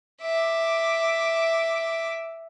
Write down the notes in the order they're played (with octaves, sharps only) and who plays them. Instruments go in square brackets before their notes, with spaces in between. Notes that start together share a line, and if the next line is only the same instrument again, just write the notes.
[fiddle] E5 D6